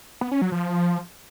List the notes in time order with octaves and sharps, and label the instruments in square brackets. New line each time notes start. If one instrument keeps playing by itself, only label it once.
[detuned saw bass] B3
C#4
F#3
F3